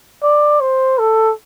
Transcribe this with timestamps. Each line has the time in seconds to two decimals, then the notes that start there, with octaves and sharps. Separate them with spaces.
0.23 D5
0.61 C5
0.98 A4